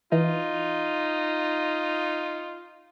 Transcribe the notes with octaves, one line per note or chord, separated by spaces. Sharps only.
E3 D#4 F4